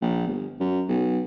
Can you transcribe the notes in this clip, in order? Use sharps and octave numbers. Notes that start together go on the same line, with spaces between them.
A#1
G1
F#2
B1